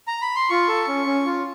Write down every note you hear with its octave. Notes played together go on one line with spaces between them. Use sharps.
A#5
B5
C6
F4 C#6
A4
C#4
C#4
F4